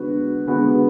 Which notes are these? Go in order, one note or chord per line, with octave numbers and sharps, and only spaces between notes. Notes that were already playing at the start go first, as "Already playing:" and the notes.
Already playing: D3 G#3 B3 F#4 B4
D3 G#3 B3 F#4 B4